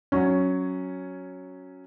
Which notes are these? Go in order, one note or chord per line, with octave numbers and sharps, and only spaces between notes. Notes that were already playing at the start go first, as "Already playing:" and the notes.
F#3 C#4